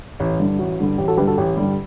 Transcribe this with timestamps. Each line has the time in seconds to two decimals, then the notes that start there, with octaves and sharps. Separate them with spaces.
0.20 A1 G4
0.40 G2 D3 G3
0.59 A1 F#4
0.79 G2 D3 G3
0.98 A1 G4
1.08 F#4 A4
1.17 G2 D3 G3 G4 B4
1.28 F#4 A4
1.38 A1 G4
1.57 G2 D3 G3